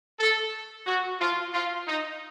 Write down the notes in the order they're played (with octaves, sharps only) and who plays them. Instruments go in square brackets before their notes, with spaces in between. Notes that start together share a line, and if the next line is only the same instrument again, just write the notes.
[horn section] A4
F#4
F4
F4
D#4